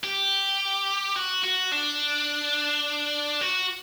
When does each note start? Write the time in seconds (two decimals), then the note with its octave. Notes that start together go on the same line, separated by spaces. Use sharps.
0.04 G4
1.16 F#4
1.44 F#4
1.72 D4
3.41 F#4